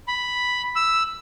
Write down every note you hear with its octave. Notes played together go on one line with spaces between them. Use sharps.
B5
E6